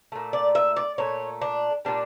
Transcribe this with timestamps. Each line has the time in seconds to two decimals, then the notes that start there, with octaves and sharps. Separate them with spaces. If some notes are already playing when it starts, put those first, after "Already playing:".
0.12 A#2 A3
0.33 D5
0.55 E5
0.76 D5
0.98 A#2 A3 C#5
1.41 D4
1.85 A#2 G3 D4